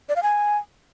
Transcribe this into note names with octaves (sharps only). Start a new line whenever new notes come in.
D5
F5
G#5